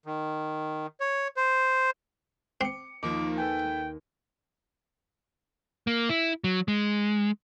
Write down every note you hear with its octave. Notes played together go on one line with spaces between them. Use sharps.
D#3
C#5
C5
C4 D6 C#7
D#2 F3 A#3 D#4 D6
A4 B4 G5 G#5
A#3
E4
F#3
G#3